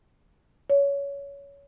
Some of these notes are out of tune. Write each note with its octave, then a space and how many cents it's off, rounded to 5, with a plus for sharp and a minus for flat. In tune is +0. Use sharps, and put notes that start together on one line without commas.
C#5 +20